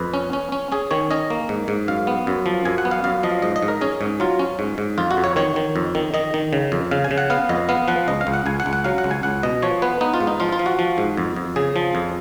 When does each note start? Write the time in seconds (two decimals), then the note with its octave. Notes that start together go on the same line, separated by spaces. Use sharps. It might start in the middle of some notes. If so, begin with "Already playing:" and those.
Already playing: F2 B4
0.14 C#4
0.33 C#4
0.52 C#4
0.72 C#4 G#4
0.91 D#3 C#5
1.11 C#4 D#5
1.30 A#3
1.49 G#2
1.68 G#2
1.88 F#2 F5
2.07 B3
2.27 F#2
2.46 F3
2.65 F#2 G#5
2.78 F#5
2.85 B3
2.91 F5
3.04 F#2 F5
3.23 F3 D#5
3.42 G#2 D#5
3.56 D#5
3.63 G#2
3.68 A#4
3.81 C#4 G#4
4.01 G#2
4.20 F#3 F4
4.39 C#4
4.59 G#2
4.78 G#2
4.98 F2 F4
5.11 F#4
5.17 F2
5.24 C#5
5.36 D#3 C#5
5.56 D#3
5.76 F2
5.95 D#3
6.14 D#3 D#5
6.34 D#3
6.53 C#3
6.72 F2
6.91 C#3 F5
7.04 G#5
7.11 C#3
7.18 F#5
7.30 B3 F5
7.49 F2 D#5
7.69 B3 F5
7.88 F3 F#5
8.08 C#2 D#5
8.21 F5
8.27 C#2
8.33 F#5
8.46 C#2 G#5
8.60 F#5
8.66 C#2
8.73 F#5
8.84 F#3 F5
8.98 F#5
9.04 C#2
9.11 G#5
9.23 C#2 F#5
9.43 B2 D#5
9.62 F3 C#5
9.82 B3 B4
10.01 B3 D#4
10.14 F4
10.20 G#2
10.27 D#4
10.40 F3 F4
10.52 F4
10.59 F3
10.66 F#4
10.79 F3
10.98 G#2
11.17 F2
11.36 F2
11.56 C#3 G#4
11.76 F3
11.95 F2